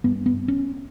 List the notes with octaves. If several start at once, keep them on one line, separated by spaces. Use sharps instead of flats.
G2 B3
B3
C#4